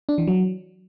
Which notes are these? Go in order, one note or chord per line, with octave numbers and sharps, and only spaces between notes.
D4
E3
F#3